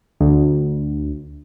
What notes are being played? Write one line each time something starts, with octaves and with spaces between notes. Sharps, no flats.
D2